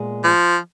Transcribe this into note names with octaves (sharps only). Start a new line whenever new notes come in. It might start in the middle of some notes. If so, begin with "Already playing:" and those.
Already playing: A#2 G#3 B3
F3